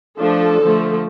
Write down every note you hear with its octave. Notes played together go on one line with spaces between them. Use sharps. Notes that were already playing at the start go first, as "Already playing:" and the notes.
F3 A3 D4 A4
D3 F3 A3